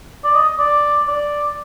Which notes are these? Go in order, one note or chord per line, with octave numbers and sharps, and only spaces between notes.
D5
D#5
D5
D5